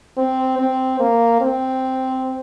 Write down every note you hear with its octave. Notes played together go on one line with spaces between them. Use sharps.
C4
C4
A#3
C4